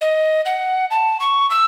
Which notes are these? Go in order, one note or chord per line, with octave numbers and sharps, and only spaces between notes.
D#5
F#5
A5
C#6
E6